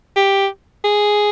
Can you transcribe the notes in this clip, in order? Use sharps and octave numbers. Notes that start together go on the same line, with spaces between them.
G4
G#4